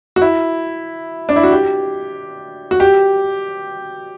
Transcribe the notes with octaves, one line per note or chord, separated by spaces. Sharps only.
F#4
E4
D4
E4
F#4
G4
F#4
G4